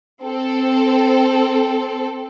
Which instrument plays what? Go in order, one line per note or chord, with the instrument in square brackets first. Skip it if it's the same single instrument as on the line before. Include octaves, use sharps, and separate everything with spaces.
[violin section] C4 A4